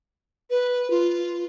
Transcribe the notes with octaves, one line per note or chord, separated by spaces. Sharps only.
B4
F4